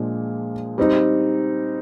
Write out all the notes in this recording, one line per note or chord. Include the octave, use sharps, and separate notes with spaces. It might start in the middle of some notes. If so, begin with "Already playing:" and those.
Already playing: A#2 F3 G#3 D4
G3 C4 D#4